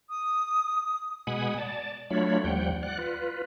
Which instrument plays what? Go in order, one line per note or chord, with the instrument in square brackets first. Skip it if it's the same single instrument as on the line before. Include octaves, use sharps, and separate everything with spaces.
[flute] D#6
[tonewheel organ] B2 G#3 F#5 G#5 B5 D#6
D5 A5
F#3 A3 D4 F4 C#5 B5
D#2 F3 G3 F#5 G5
D5 F#5 F#6
F4 B4